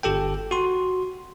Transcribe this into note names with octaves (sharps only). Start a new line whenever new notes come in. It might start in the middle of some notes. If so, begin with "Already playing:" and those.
G1 G4 A4 G5
F#4 C6